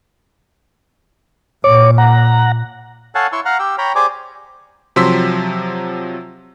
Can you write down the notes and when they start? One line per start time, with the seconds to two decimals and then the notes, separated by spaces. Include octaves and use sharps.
1.64 A#2 C#5 D6
1.98 F#5 A#5
3.15 A4 C#5 F5 F#5 G#5 A5
3.32 E4 C#5 C6 C#6 E6
3.45 F5 F#5 A#5 F6
3.59 G4 G5 E6
3.78 C#5 G5 A#5 B5
3.95 G4 G#4 C5 D5 G#5 D6
4.96 C3 F3 F#3 C6 E6 B6